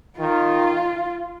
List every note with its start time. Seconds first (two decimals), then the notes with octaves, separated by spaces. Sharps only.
0.19 D#3 F4